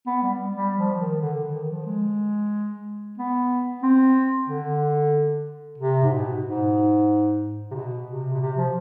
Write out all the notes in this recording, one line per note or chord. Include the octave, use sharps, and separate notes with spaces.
B3
G3
G3
F3
D#3
D3
D3
D#3
F3
G#3
B3
C4
D3
C3
G#2
B2
G#2
C3
B2
C3
B2
C3
F3